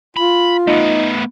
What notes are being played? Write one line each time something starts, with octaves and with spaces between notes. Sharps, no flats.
F4 B5
A3 B3 D#4